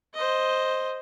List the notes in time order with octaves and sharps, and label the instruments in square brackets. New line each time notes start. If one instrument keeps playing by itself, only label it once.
[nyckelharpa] C5 D#5